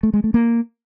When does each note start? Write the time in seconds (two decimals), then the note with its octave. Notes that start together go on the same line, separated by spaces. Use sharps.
0.03 A3
0.14 G#3
0.24 A3
0.34 A#3